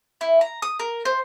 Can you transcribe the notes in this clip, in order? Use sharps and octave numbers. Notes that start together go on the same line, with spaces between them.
E4
A#5
D#6
A#4
C5